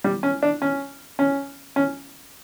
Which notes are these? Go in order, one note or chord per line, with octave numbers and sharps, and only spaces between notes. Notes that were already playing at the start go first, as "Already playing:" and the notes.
G3
C#4
D4
C#4
C#4
C#4